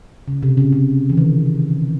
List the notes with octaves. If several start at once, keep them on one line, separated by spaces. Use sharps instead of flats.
C#3
C3
C#3
C#3
E3
D#3